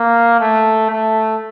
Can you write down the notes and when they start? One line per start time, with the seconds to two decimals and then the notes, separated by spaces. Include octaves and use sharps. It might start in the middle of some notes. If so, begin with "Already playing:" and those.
Already playing: A#3
0.40 A3
0.90 A3